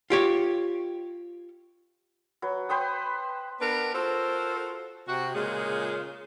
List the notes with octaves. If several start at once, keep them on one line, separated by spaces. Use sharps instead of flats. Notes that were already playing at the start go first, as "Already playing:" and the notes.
F4 G4 C#5
F#3 B4
B4 C5 G5 D#6
B3 D4 A#4 B4
F4 F#4 A4 A#4 C5
C3 F#4
A#2 C#3 G#3 F4 G#4